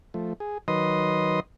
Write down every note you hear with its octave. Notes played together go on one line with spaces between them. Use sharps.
F3 A3
G#4
D#3 F#3 B4 D#5 C6 D#6